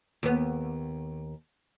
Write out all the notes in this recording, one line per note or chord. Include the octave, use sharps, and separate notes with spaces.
D#2 B3